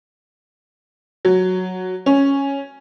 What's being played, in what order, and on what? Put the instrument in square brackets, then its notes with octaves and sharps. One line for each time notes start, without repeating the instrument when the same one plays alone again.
[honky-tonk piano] F#3
C#4